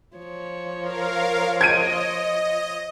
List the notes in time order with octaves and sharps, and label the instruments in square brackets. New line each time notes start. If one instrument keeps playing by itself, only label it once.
[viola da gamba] F3 C#5
[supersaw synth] A#4 F5
[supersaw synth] D#5 [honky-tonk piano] G#6 D7 D#7